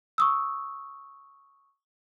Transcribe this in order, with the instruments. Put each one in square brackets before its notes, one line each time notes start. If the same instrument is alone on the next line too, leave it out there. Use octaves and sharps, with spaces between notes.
[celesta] C#6 D#6 E6